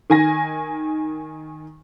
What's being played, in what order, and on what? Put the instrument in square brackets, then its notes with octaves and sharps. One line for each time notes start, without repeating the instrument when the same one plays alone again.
[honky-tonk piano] D#3 G#5 A#6